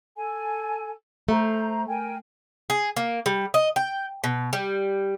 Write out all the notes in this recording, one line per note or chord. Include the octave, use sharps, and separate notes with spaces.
A4 G#5
A3 C5 A#5
A#4 G5 G#5
G#4
A#3
G3
D#5
G5
B2
G3